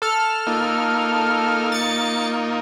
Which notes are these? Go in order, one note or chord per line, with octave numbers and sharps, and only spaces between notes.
A4 F6
A#3 D#4 F4
A6 C#7